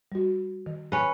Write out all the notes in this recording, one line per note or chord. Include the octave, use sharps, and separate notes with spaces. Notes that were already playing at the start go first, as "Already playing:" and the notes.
G3 F#4
D#3
C#4 B4